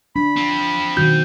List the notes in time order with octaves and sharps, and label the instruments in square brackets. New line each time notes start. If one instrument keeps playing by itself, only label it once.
[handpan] D4 [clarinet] B5
[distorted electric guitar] F3 C4
[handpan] B2 D#3 F#4 [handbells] G6